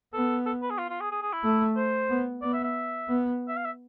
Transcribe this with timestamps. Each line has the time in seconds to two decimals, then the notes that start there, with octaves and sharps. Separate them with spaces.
0.13 B3 A4
0.46 A4
0.62 B4
0.70 G#4
0.78 F4
0.90 F4
1.01 G#4
1.12 G#4
1.22 G#4
1.33 E4
1.44 A3
1.77 C5
2.09 B3
2.42 B3 D5
2.53 E5
2.64 E5
3.08 B3
3.49 E5
3.57 F5
3.65 E5